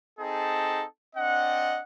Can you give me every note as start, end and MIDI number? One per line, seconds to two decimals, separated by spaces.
0.20 0.84 60
0.20 0.84 63
0.20 0.84 68
0.20 0.84 69
0.20 0.84 75
0.20 0.84 81
1.16 1.81 60
1.16 1.81 62
1.16 1.81 75
1.16 1.81 78